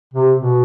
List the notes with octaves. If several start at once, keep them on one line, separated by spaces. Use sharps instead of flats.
C3
B2